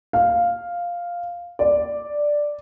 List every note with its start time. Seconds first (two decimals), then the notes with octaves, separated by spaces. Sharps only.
0.13 F5
1.59 D5